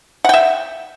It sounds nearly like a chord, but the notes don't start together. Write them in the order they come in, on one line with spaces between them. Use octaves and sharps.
F#5 G5 E5